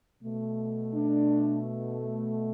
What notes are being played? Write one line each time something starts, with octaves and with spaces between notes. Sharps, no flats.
B2 A3
D4